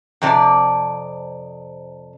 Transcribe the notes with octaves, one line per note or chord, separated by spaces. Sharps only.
F2 C3 D5